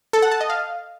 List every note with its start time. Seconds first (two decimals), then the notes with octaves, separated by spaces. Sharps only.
0.13 A4
0.22 F#5
0.32 A5
0.41 D#5
0.50 F5